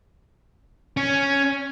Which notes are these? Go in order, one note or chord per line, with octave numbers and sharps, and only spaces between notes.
C#4